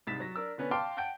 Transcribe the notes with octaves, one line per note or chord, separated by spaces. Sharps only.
C2 G#2 A6 B6 E7
F#3 A#6
D4 A#4 E6
D3 B3 C#4 B4
F5 G5 A5 C6 D6 F6
F#5 G5 A5 G6 D7